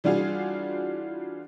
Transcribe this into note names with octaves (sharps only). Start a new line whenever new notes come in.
E3 G3 D4 F4 F#4 G#4